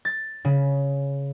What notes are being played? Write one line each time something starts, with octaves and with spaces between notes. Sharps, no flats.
A6
C#3